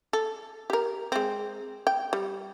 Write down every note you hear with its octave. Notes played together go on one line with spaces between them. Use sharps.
A4
G4 A#4
G#3 C4
G5
G3